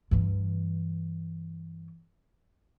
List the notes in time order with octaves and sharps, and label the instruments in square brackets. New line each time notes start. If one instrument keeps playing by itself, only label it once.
[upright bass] G2 E3